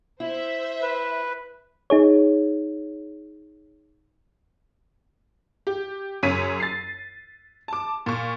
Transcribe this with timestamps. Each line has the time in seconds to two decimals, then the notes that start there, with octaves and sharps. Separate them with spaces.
0.20 E4 C5 E5
0.82 B4
1.90 D#4 G#4 C#5
5.67 G4
6.23 F#2 C#3 C#5 B6 D#7
6.60 A6 C7
7.68 A5 D6
8.06 A#2 C#6